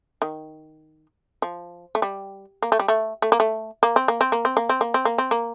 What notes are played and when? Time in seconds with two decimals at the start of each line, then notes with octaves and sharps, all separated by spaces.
0.22 D#3
1.42 F3
1.95 A3
2.02 G3
2.62 A#3
2.72 A3
2.80 G3
2.88 A3
3.22 A3
3.32 A#3
3.40 A3
3.83 A#3
3.96 C4
4.08 A#3
4.21 C4
4.32 A#3
4.45 C4
4.57 A#3
4.69 C4
4.81 A#3
4.94 C4
5.05 A#3
5.18 C4
5.31 A#3